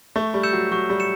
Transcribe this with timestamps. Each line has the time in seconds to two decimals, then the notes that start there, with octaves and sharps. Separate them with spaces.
0.16 A3 C#6
0.34 G3
0.43 E6 G6 C#7 E7
0.53 F#3
0.71 F#3 C#6
0.90 G3
1.00 C#7 E7